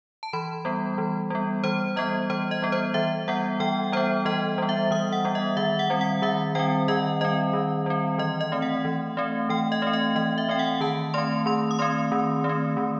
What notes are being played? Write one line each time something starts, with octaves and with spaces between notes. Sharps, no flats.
A5
E3 B5
G3 B3
E3
G3 B3
E3 C5
G3 B3 D#5
E3 C5
D#5
G3 B3
C5
E3 E5
G3 B3 F#5
E3 G5
G3 B3 C5
E3 D#5
G3 B3
E5
E3 D#6
F#5
G3 B3
D#5
D#3 E5
F#5
G3 C4
F#5
D#3 E5
G3 C4 G5
D#3 D#5
G3 C4 D#5
D#3
G3 C4
E3 D#5
D#5
A3 C4
F#5
E3
A3 C4
E3 G5
D#5
A3 C4
D#5
E3 D#5
E5
A3 C4 G5
F#5
D#3 A5
A3 C4 C6
D#3 C6
D#6
A3 C4 C6
D#3
A3
C4
D#3